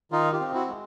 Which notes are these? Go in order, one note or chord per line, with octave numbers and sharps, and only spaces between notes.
D#3 D#4 F4
F4 G4
C4
E4 F#4
G#3